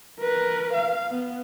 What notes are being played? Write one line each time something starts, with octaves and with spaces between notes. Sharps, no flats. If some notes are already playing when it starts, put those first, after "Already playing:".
A#4 B4
F5
B3